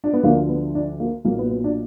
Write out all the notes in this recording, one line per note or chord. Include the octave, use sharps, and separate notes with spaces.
D4
B3
D2 D3 F3 A#3
B3
D4
A#3
B1 A#2 F#3 A#3
B3
B3
D4